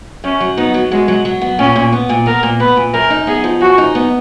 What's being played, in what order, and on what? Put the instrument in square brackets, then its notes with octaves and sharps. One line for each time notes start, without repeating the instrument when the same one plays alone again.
[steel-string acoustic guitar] F#2 [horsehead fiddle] C#4
[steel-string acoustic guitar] F#3
[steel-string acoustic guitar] B3 [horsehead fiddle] D#4
[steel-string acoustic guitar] F#3
[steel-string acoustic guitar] F#3 [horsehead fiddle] G#3
[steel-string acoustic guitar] F#3
F#3
B3
[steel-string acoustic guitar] A#2 [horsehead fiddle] C#4
[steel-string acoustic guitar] A#2
B3
A#2
[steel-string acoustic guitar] B3 [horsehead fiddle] A#4
[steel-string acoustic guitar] A#2
[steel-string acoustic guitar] B3 [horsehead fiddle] B4
[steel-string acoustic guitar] A#2
[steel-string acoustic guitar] F#2 [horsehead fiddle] A#4
[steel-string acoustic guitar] D#4
[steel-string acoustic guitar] B3 [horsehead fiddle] G#4
[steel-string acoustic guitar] F3
[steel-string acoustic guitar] F#2 [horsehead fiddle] F#4
[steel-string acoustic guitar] D#4
B3